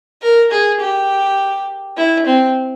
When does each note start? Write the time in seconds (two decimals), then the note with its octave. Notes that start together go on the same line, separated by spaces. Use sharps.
0.22 A#4
0.51 G#4
0.80 G4
1.97 E4
2.27 C4